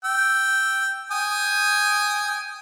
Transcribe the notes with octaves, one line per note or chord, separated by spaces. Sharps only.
G5 E6
G5 G#5 D#6